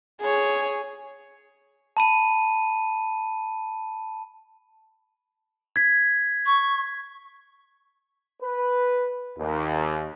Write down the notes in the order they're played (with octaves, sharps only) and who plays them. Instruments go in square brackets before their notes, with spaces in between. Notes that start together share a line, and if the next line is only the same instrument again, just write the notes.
[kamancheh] G#4 C#5
[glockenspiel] A5 B5 D#7
G#6 B6
[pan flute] C#6
[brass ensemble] B4
D#2